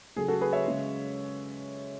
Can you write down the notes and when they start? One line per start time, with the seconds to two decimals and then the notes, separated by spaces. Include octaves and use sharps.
0.16 C#3 F#3 A3 G#4
0.28 F#4 A4
0.41 G#4 B4
0.53 C#5 E5
0.65 C#3 G#3